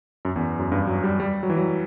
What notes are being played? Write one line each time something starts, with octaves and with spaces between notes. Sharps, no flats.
F#2
E2
F#2
G2
F#3
G3
G3
F#3
E3
F#3